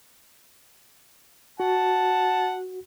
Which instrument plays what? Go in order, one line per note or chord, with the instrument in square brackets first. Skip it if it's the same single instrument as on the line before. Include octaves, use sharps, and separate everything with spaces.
[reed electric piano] F#4 [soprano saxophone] F#5 [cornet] A5